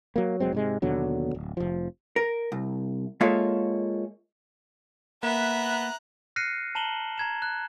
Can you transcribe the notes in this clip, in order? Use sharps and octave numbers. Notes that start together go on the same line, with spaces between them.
F#3 A#3
F1 F#3 G#3 C4
G#2 C3 G#3
D#2 B2 D3 F#3
D1
F1 F3
A#4
C2
G#3 A#3 F4 A4 C#5 E5
A#3 B3 E5 A#5 F#6
F6 F#6 A#6 C7 C#7 D#7
A5 A#5 E7 F#7 G7
A#5 G#6 E7
F#6